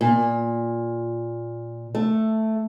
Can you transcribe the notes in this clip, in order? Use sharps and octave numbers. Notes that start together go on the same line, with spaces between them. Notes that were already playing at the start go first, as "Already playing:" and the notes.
A#2
A3